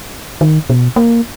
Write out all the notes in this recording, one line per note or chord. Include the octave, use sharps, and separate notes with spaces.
D#3
B2
A#3